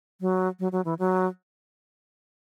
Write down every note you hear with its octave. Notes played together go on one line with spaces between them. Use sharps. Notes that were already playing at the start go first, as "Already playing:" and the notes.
F#3
F#3
F#3
E3
F#3